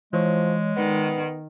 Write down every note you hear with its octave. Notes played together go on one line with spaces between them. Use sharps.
E3 F3 G#3 C#5
D#3 B3 D5